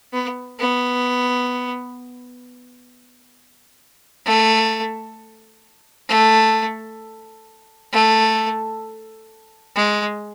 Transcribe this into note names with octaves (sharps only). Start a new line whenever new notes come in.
B3
B3
A3
A3
A3
G#3